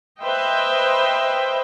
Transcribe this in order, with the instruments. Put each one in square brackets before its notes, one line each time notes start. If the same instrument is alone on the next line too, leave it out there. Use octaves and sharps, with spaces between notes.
[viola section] B4 C5 D#5 E5 G5